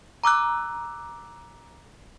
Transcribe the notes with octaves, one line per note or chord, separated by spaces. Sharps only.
A#5 D6 E6 F#6